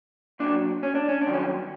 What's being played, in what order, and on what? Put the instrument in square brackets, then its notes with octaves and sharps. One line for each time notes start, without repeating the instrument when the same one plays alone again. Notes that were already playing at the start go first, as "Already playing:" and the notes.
[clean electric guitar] A#2 F#3 D4
C#4
D4
C#4
D4
G2 D#3 F#3
C#4